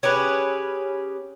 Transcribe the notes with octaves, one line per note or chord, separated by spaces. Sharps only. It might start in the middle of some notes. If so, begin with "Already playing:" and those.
C#4 G4 G#4 B4